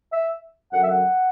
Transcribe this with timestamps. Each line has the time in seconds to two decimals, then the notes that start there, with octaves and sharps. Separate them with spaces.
0.12 E5
0.73 F#2 D3 F#3 F#5
0.81 E5
0.89 F#5